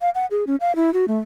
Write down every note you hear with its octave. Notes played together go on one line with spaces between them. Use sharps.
F5
F#5
G#4
C#4
F5
E4
F#4
A3